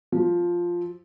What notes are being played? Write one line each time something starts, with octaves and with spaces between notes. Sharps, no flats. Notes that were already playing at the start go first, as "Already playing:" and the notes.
F3